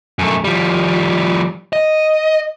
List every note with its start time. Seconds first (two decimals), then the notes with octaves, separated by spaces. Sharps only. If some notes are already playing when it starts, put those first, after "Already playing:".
0.19 F#2 A3
0.44 F3 G3
1.73 D#5